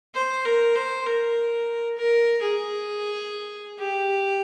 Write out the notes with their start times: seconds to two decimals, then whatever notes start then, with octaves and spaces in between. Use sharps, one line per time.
0.15 C5
0.45 A#4
0.75 C5
1.06 A#4
1.97 A#4
2.42 G#4
3.79 G4